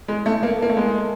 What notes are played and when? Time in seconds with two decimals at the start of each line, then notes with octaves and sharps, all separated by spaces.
0.08 G#3
0.26 A3
0.43 A#3
0.62 A#3
0.70 A3
0.77 G#3